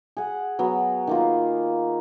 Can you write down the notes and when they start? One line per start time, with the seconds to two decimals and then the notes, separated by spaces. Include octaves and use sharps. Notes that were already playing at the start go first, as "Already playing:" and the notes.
0.17 G#4 F#5
0.59 F#3 B3
1.07 D#3 A#3 F4